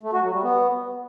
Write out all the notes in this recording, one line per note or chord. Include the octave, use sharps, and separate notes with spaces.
A3
F#4
F#3
G3
B3